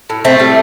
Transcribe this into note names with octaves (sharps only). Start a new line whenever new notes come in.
A2
A2 A3 C4
G3